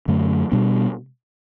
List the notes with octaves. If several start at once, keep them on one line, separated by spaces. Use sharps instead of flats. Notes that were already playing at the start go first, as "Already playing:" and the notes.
F#2 D3 F#3 A3
B2 G3 B3 D4